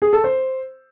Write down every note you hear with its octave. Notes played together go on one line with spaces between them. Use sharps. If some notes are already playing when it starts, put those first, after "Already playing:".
G#4
A4
C5